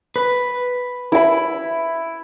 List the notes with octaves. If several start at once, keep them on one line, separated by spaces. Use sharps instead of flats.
B4
E4 B5